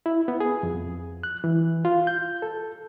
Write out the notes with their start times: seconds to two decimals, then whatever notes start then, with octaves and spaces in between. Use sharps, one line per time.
0.06 E4
0.28 B3
0.40 G#4
0.63 F2
1.23 F#6
1.44 E3
1.85 F4
2.07 G6
2.42 A4